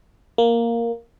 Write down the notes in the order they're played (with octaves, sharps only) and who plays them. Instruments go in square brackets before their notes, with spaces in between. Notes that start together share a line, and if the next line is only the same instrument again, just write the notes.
[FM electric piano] A#3